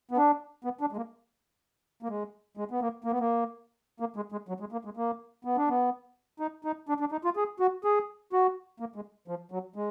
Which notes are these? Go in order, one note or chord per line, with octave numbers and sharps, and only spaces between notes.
B3
D4
B3
D4
G#3
A#3
A#3
G#3
G#3
B3
A#3
A#3
B3
A#3
A#3
G#3
G#3
F#3
G#3
A#3
G#3
A#3
B3
D4
B3
D#4
D#4
D4
D4
D#4
F4
G#4
F#4
G#4
F#4
A#3
G#3
F3
F#3
G#3